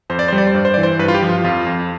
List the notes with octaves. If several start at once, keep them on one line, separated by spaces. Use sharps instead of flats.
F2 C5
D5
G3 C5
D5
C5
G2 D5
C5
E3 D5
C5
G2 B4
F4
G4
F3
F4
F2 F4
F2